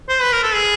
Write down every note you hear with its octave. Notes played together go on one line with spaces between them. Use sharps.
C5
B4
A#4
A4
G#4